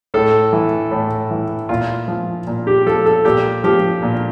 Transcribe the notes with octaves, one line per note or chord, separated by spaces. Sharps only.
A2 A4
E3
A2
E3
A#2 F4
F3
A#2
G4
F3 A4
A4
A#2 G4
F3 G4
A#2